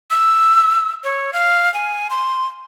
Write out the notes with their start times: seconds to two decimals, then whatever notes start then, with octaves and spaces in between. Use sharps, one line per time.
0.11 E6
1.04 C#5
1.33 F5
1.74 G#5
2.10 C6